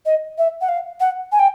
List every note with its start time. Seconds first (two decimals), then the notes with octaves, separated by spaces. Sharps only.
0.06 D#5
0.38 E5
0.61 F#5
0.69 F5
1.00 F#5
1.32 G#5
1.39 G5